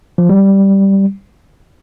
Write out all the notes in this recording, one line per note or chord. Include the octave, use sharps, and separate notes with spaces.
F3
G3